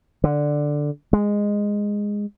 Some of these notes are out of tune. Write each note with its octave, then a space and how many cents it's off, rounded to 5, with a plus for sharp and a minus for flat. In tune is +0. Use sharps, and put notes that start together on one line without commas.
D3 +5
G#3 -10